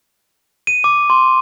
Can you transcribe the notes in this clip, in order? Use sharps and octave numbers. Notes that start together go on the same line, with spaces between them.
D#7
D6
C6